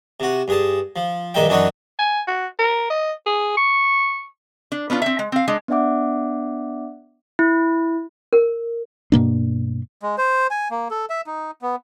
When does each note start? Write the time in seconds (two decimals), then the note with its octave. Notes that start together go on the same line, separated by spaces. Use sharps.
0.20 C3 F#4
0.48 G2 G#4 A5
0.96 F3
1.34 A#1 G2 D#3 D#4 E5 G5
1.48 F#2 E3 D4 D#4 C#5 F#5
1.99 G#5
2.28 F#4
2.59 A#4
2.91 D#5
3.27 G#4
3.57 C#6
4.72 D4
4.90 B3 C#4 D4 F4
5.02 C4 E5
5.19 G#3
5.32 C4 F5
5.48 G#3 D4
5.68 B3 D4 D5 E5 F#5 D6
7.39 E4
8.33 A#4
9.12 G2 B2 A#3 D4
10.03 G#3
10.18 C5
10.51 G#5
10.71 A#3
10.91 A4
11.10 E5
11.27 D#4
11.62 B3